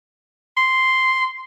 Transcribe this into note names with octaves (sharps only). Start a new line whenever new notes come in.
C6